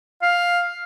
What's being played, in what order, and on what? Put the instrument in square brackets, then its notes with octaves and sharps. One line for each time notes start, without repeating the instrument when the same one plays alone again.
[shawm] F5